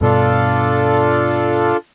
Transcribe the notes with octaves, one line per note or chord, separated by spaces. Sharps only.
G2 B2 D4 F4 A4